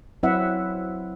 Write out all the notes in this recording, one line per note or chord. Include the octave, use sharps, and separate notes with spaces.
F#3 C4 E4 B4 E5 F#5